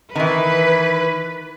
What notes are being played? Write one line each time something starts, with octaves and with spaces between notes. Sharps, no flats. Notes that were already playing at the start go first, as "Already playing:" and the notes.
D#3 E3 B4